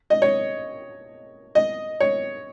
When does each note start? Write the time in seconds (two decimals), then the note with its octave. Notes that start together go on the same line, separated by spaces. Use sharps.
0.10 D#5
0.22 C#5
1.55 D#5
2.00 C#5